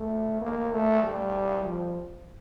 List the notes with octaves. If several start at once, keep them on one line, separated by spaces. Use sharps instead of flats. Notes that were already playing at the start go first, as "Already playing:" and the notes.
Already playing: A3
A#3
A3
G3
F3